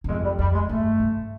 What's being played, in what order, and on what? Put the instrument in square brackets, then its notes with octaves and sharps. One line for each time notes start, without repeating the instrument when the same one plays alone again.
[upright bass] F#2
[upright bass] F2 [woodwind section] G#3
[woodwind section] G3
[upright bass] F2 [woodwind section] G3
[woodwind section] G#3
[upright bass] G2 [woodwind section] A3
[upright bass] G#2